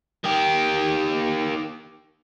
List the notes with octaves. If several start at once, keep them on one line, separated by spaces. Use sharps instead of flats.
D#3 G4